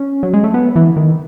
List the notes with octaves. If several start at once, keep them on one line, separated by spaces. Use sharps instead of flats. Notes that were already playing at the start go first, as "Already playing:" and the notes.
Already playing: C#4
F#3
G#3
A3
B3
E3
D#3